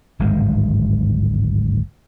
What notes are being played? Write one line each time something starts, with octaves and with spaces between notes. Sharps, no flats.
D1 G#1 G2 G#3